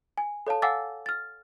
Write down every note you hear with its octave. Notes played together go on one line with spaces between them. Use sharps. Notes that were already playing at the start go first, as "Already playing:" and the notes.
G#5
A4 C#5 F5 A5
F5 F#5 G#5 D6 E6 A6
F6 A6